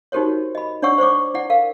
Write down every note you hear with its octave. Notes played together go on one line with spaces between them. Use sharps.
D#4 F#4 G4 A#4 C5 C#5
D#5 B5
D4 C#5 D5 F#5 C#6 E6
C5 D5 C#6 D6
E4 D5 F#5
A#4 F5